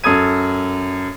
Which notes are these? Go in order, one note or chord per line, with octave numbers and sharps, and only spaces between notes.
F#2 A4 D#6 G#6 D#7